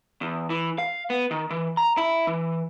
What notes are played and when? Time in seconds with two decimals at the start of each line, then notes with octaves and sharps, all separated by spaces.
0.21 E2
0.50 E3
0.78 F5
1.10 B3
1.31 D#3
1.50 E3
1.77 A#5
1.97 E4
2.27 E3